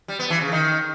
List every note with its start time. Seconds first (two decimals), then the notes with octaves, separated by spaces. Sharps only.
0.08 G3
0.19 B3
0.30 E3
0.41 C#3
0.52 D#3